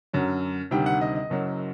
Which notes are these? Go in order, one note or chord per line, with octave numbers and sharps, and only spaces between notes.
F#2 D3 F#3
D2 C3 D#3 G3 G5
F#5
D#5
D#5
F#1 F#2 F#3